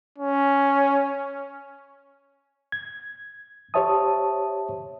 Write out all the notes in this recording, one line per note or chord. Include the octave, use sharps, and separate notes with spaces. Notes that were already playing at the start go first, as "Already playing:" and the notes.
C#4
G#6
G4 C5 C#5 E5 A5 D#6